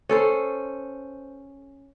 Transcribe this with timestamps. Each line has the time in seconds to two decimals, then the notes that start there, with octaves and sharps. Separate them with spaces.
0.09 C#4 A4 C5